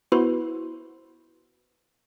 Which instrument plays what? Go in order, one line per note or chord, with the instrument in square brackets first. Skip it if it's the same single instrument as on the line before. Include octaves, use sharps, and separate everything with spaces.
[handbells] B3 E4 F#4 B4 C5 C6